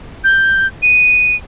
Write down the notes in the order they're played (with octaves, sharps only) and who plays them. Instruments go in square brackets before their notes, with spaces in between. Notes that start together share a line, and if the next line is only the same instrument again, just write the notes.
[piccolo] G6
D#7